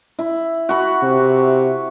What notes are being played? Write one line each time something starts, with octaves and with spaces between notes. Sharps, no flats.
E4
F#4 B5
C3